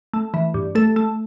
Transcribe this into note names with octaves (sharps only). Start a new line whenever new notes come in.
A3
E3
G2
A3 A4
A3